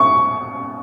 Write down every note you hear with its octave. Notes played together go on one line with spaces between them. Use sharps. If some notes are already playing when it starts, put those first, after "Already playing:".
Already playing: C#6